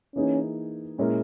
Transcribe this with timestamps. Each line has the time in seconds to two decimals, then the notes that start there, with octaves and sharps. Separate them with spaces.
0.15 E3 A#3 C#4 D#4 G#4
0.98 A#2 G#3 C#4 E4 A#4